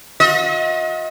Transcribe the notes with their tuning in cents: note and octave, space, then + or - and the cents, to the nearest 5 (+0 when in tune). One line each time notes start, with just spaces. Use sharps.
F4 +45 D#5 +35